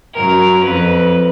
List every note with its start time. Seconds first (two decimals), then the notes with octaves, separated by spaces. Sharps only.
0.15 F#2 A#4
0.64 F2 B4